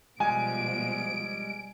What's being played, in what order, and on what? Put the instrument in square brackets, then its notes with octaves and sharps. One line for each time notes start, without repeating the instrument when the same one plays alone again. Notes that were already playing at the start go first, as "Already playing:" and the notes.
[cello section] B2 F3 [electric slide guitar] G3 G#3 [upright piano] G#5 [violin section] D7